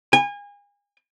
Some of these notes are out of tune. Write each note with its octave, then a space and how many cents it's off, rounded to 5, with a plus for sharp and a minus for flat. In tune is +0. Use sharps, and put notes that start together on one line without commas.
G#5 -35